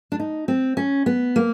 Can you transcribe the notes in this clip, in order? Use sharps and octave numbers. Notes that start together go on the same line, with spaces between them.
D4
D#4
C4
C#4
B3
A#3